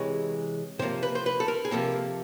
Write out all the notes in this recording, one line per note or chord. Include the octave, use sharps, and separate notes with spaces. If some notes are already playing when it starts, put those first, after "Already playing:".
Already playing: C3 E3 G#3 C#5
C3 F3 A#3 C5
B4
C5
B4
A4
A#4
G#4
C3 F3 A#3 A4